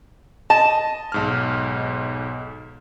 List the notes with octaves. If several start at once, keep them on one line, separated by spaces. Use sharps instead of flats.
D#5 A5
B1 G#2 F6